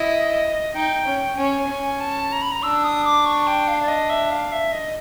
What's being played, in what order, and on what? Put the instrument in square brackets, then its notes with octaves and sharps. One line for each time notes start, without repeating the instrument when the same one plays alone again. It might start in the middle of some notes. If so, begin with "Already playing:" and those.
Already playing: [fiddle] E4 [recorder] D#5
[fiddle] D#4 [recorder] G5
[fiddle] C#4
[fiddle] C#4 [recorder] G#5
[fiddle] C#4
[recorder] A5
A#5
B5
A#5
[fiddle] D4 [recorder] E6
[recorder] D#6
D6
C#6
G5
F5
D5
D#5
E5
F5
E5
D#5